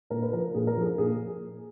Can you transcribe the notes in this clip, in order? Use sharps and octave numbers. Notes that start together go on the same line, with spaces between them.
A#2 A#4
B4
F3 A#4
A#2 G#4
A#4
F3 G#4
A#2 G#4